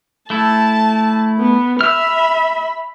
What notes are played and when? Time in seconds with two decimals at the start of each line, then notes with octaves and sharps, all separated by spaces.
0.30 A3 E4 A5
1.39 B3
1.81 E5 B5 E6 F6